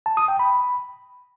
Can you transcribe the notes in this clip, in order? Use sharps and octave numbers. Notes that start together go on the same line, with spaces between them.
A5
D#6
G5
B5